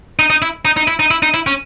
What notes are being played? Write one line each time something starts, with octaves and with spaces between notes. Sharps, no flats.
D#4
D#4
E4
D#4
D#4
E4
D#4
E4
D#4
E4
C#4